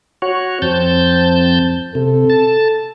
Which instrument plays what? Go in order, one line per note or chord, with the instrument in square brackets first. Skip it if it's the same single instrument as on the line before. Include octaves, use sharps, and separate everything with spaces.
[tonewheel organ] F#4 C#5
[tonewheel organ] F2 A5 G6 [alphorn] C4
[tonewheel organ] C3 [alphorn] A4
[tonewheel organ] A5